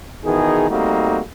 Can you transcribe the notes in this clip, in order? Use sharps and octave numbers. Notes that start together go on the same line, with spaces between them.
B2 D#3 E3 D#4 G#4
G3 A3 A#3 C4 D#4 F#4